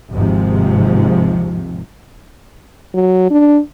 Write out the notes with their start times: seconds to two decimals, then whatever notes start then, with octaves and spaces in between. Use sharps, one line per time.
0.12 G#1 D#2 G#2 C3 F3
2.94 F#3
3.31 D4